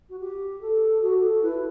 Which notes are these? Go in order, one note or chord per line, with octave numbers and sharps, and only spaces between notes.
F#4
G4
A4
F#4 A4
G4
A4
E4 B4